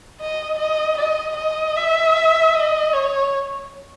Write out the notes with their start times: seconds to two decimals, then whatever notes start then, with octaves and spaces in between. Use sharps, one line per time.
0.21 D#5
0.59 D#5
0.98 D#5
1.37 D#5
1.76 E5
2.55 D#5
2.93 C#5